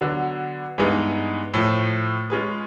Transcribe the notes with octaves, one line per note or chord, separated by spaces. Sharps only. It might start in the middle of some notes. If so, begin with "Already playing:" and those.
D3 F#3 B3 D4
G2 E3 G#3 B3 D#4
A2 F3 A3
G#3 C#4 F4 G#4 B4